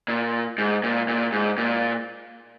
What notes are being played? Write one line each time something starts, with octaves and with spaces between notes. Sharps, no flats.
A#2
G#2
A#2
A#2
G#2
A#2